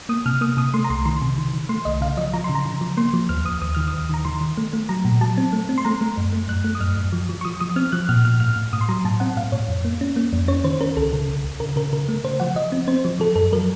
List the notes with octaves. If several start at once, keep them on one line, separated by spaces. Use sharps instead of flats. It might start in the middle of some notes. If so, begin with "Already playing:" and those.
A#3 D#6
C3 F6
A#3 D#6
C3 D#6
A3 C6
A#5
C2 C6
D#3 C6
C3
D#3
D#3
A3 C6
C2 D#5
C#3 F5
F3 D#5
F3 A#5
C6
C#3
A#5
C#3
F3
A#3 C6
F3
D#2 F6
D#2 D#6
D#2 D#6
D#3 F6
D#6
D#2
D#3 A#5
D#3 C6
D#3
A3
A3
F#3 A#5
A#2
F#3 A5
C4
A3
C4
C6
A3 A#5
A3
F#2
A3
F#2 F#6
A3
D#6
F#2 F6
F#2
F3
F3
C#6
F3 D#6
F3 D#6
C4 F6
F3 F#6
A#2 F6
A#2 F6
A2 F6
A2
A2 D#6
C6
F#3 A#5
A2 A5
C4 F#5
A2 F5
A2 C#5
F2
A#3
C#4
A#3
F2
C#4 C#5
D#3 C5
C#4 A#4
C#2 A4
C#3
C#2
C#2
C#3 A#4
C#3 A#4
C#3 A#4
A3
C#3 C5
F3 F#5
F3 D#5
C4
C4 C5
F3
F3 A4
F#2 A4
F#3 A#4